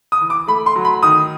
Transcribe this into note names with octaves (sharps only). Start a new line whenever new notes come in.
D#6
E3
D6
A3 B5
C6
F#3
B5
D#3 D#6